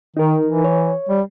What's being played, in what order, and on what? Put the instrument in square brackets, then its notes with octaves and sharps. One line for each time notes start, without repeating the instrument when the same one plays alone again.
[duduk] D#3 [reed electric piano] D#4 A#4
[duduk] E3
[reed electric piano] C#5
[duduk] G3